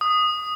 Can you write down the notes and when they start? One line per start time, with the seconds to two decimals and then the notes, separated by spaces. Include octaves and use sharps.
0.01 D#6